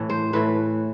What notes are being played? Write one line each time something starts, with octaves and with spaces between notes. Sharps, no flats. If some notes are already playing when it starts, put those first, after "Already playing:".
Already playing: A2 E3 A3
C5
A2 E3 A3 B4